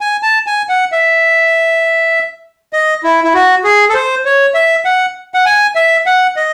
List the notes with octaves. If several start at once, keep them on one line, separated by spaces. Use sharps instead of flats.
G#5
A5
G#5
F#5
E5
D#5
E4
E4
F#4
G#4
A4
C5
C#5
E5
F#5
F#5
G#5
E5
F#5
D#5